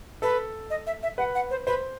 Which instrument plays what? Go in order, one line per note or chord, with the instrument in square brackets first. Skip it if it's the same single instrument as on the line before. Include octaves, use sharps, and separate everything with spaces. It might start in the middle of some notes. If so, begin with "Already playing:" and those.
[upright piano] A4 [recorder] B4
[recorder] D#5
E5
E5
[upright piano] B4 [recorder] F#5
[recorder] F#5
C5
[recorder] B4 [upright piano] C5